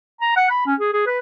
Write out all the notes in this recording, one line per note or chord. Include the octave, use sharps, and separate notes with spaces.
A#5
F#5
B5
C#4
G#4
G#4
B4